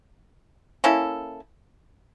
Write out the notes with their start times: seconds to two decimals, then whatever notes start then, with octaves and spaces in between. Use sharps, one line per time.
0.84 A#3 C#4 E4 A4